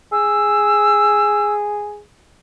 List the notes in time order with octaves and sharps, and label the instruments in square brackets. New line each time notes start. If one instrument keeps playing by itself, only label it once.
[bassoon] G#4 [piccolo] E6